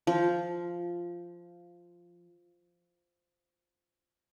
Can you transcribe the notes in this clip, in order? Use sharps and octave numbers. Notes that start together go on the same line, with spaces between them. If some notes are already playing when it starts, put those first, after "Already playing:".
F3